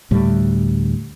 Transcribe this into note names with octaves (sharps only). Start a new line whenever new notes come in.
D2 A2 G3